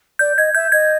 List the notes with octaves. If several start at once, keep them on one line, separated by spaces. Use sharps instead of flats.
D5 G6
D#5 G#6
E5 G6
D#5 G#6